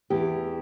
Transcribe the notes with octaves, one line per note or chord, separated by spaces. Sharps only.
E2 E3 G4